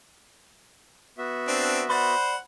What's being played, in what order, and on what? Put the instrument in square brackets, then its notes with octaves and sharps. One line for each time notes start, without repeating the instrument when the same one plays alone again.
[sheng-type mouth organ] B3 F#4 E5
[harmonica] C4 D4
[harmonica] C5 F#5 [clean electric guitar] D5 B5